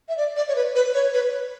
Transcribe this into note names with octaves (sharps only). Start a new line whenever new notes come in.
E5
D5
D5
C#5
B4
B4
C#5
B4